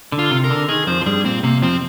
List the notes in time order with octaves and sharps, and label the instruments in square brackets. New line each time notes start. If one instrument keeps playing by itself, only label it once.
[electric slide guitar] D3
[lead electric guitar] F4
[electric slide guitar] C3
[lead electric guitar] A#4
[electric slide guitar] D3
[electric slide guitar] D#3 [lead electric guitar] G#4
[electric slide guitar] F2 F3 [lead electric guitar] C5
[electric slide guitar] F3
[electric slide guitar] G2 G3 [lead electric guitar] G#4
[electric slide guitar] A#2 [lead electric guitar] C4
[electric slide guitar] C3 [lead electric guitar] A#3
[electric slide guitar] F2 F3 [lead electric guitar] C4